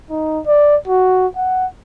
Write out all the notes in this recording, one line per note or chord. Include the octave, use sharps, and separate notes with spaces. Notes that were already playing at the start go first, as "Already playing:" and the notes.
D#4
D5
F#4
F#5